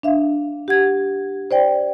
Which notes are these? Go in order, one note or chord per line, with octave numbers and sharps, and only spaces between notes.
D4 E5 F5
G4 F#5 G#6
C5 D5 G5